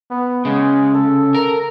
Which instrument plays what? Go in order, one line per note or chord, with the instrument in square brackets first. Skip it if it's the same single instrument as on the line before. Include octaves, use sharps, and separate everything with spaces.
[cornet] B3
[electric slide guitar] C#3 [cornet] G#3
[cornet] A4
[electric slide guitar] A#4